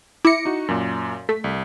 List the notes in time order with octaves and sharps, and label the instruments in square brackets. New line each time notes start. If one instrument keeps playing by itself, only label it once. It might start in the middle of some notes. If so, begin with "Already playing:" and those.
[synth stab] E4 C#7 [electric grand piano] D6 A#6
[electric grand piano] D#4 F#4
F#2 A#2
[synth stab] A3 [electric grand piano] B6
[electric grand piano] C2